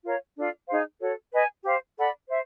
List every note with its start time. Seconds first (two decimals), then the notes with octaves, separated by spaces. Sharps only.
0.03 F4 A#4 C#5 F5
0.36 D4 F4 A4 D5
0.68 D#4 G#4 C5 F5
1.00 F#4 A4 C#5
1.32 B4 D#5 G#5
1.64 G4 C5 F5
1.97 A4 D5 F#5 B5
2.29 C5 E5